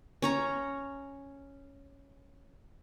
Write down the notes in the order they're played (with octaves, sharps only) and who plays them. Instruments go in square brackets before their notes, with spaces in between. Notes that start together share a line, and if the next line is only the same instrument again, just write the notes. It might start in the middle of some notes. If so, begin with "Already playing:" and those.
[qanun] C#4 C#5 A#5